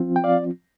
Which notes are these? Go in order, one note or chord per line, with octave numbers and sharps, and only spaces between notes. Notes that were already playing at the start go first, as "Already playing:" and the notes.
Already playing: F3 C4 F4
G5
D5 F5